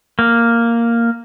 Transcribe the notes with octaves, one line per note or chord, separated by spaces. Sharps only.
A#3